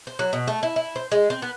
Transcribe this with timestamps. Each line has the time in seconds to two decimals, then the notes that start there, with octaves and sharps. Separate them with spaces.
0.07 C5
0.19 F#3
0.33 B2
0.48 A3
0.63 E4
0.76 E4
0.96 C5
1.12 G#3
1.30 C4
1.42 B3